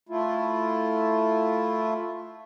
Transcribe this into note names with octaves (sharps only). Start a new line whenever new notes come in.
A3 E4 F4